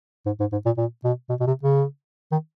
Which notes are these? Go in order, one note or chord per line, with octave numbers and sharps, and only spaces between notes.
G#2
G#2
G#2
A#2
A#2
B2
B2
B2
C3
C#3
D#3